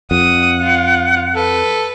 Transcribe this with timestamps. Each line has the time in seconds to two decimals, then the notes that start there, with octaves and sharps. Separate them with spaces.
0.11 F2 F#5 D#6
0.61 F4
1.35 A4 B4